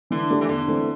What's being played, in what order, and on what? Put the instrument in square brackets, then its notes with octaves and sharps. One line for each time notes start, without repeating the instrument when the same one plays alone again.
[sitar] D3 [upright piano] E3
[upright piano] A3 D4 G4
[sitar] E3
[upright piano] E2 [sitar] D3
[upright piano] E3 A3 C4